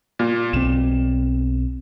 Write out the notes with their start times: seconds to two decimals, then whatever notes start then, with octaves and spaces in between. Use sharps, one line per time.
0.19 A#2
0.53 B1 B2 C4 E7